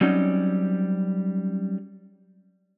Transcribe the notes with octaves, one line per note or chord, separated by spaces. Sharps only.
F#3 G3 C4 C#4 D#4